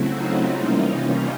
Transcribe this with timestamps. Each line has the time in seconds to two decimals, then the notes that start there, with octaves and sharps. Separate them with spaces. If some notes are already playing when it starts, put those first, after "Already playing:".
Already playing: C#3 F#3 A3 C4 E4 F#4
0.13 D#4 F4
0.58 C3 E3 G3 A#3 C#4
1.05 C#4 D#4